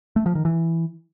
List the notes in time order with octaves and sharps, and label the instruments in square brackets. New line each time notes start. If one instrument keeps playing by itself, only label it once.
[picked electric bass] A3
F3
D#3
E3